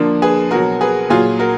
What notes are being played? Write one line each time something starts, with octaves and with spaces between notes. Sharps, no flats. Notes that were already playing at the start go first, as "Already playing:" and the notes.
Already playing: D3 F3 A#3 D4
G#4 B4
B2 F#3 F#4 A#4
G#4 B4
A#2 F#3 F4 G#4
F#4 A#4